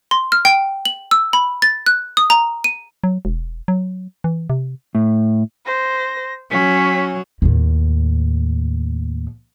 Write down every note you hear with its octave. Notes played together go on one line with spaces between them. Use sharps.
C6
F6
G5
F#7
E6
B5
A6
F#6
D#6
A#5
D#7
F#3
E1
F#3
E3
C3
A2
C5 A#6
F#3 C#4 B6
D#2 A2